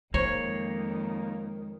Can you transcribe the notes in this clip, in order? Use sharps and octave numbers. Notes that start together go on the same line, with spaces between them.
F2 D#3 G#3 A#3 C#5